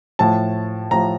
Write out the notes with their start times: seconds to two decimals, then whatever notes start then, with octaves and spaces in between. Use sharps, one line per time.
0.19 A2 F3 A5
0.91 A2 F3 A#5